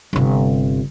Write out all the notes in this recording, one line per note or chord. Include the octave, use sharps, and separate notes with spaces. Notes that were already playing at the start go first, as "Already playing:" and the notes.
G1 C3